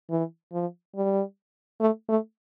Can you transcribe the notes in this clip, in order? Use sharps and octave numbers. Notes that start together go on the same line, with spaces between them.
E3
F3
G3
A3
A3